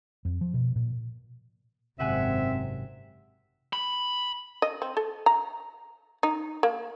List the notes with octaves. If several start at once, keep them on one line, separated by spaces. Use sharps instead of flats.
F2
F3
B2
A#2
G#1 F#2 C3 C4 E5 F#5 G#5
B5
D#5
C4
A4
A#5
D#4
A#3